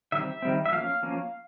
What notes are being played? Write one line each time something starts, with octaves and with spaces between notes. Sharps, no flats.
D#3 G3 C4 E5
D#3 G3 C4
E5
F3 A#3 C#4 F5
F3 A#3 C#4